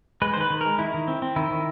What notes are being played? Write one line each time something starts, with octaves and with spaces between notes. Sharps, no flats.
G#3 B4
C5
D#3 B4
D#3
G#3 A#4
D#3 E4
D#3
C4
C4
D#3 E4
D#3